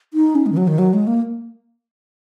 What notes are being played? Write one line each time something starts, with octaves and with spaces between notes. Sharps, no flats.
D#4
C#4
G#3
D#3
F#3
D#3
F#3
G#3
A#3